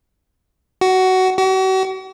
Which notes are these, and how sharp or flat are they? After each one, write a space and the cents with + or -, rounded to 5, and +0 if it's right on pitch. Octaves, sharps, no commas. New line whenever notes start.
F#4 +15
F#4 +40